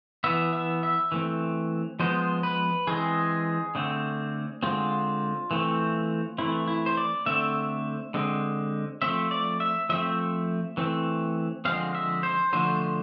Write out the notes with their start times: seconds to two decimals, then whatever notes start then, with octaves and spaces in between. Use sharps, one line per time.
0.24 E3 B3 E5
0.53 E5
0.83 E5
1.12 E3 A3 C4
2.00 F3 G#3 B3 C5
2.43 B4
2.87 E3 G#3 C4 G#4
3.75 D3 A3 C4
4.63 D3 G#3 C4 F4
5.51 E3 A3 C4
6.38 E3 A3 C4 E4
6.68 E4
6.86 C5
6.97 D5
7.26 D3 A3 C4 E5
8.14 D3 G#3 C4
9.02 F3 A3 C4 E5
9.31 D5
9.60 E5
9.89 F3 A3 C4 E5
10.77 E3 A3 C4
11.65 D3 F3 G#3 C4 F5
11.95 E5
12.23 C5
12.53 D3 F3 A3 C5